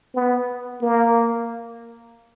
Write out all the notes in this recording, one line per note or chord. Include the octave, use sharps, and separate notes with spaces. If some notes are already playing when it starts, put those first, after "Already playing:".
B3
A#3